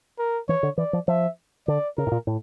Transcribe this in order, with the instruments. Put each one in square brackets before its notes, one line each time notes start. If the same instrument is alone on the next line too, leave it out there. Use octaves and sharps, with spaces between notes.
[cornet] A#4
[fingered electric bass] E3 [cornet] C#5
[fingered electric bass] D3
[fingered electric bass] E3 [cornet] D5
[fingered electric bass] F3
[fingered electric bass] F3 [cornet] E5
[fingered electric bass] D3 [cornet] D5
[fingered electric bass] C#3 [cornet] A#4
[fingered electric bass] A2
A#2
A2